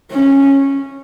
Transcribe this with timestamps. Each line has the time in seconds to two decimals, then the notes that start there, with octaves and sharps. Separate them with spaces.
0.12 C#4